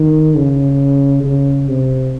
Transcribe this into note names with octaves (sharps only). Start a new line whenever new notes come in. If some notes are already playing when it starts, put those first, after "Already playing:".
Already playing: D#3
C#3
C#3
C3